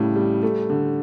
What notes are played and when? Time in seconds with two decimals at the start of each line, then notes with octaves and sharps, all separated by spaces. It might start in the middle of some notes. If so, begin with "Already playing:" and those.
Already playing: A2 C#3 G3
0.16 G3
0.43 A3
0.69 D3